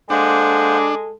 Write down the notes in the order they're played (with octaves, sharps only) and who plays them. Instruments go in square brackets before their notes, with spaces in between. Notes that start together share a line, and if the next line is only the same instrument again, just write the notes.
[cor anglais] G#3 [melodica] A#3 C5 F#5 [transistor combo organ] D4 [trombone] A4